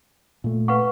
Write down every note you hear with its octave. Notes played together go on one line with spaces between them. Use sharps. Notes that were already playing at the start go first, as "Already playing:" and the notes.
A#2 A3
B4 F5 F#5 C#6